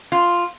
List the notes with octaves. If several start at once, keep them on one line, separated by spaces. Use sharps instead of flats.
F4